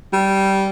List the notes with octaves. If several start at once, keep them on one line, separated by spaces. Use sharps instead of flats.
G3